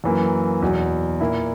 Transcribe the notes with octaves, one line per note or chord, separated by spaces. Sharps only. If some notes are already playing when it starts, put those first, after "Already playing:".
F#2 E3 A#3
E2 B2 F#3
A#2 A#3 E4